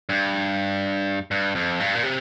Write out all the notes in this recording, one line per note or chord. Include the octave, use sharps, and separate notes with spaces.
G2
G2
F2
G2
A#2
C3